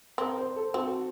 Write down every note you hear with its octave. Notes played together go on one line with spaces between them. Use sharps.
C4 A#4
C5
A4
C4 F#4